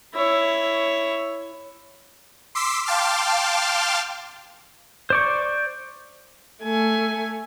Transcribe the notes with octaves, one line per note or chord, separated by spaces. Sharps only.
E4 C#5
C6 D6 E6 B6 C7
F5 G5 A5 C6 D6 F6
C5 D5 C#6
A3 G#5